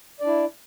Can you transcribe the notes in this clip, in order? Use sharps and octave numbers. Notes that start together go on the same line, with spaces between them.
D4 E4 D5